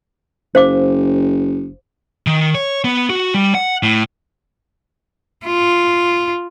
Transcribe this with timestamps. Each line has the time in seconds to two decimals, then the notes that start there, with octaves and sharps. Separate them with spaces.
0.55 F#1 C5 F5 D6
2.27 D#3
2.55 C#5
2.85 B3
3.10 F#4
3.34 G3
3.55 F#5
3.83 A2
5.46 F4